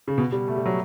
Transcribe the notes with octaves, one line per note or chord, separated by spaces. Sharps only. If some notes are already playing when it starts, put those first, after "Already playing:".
C#3
B2
G3
A3
G3
F#3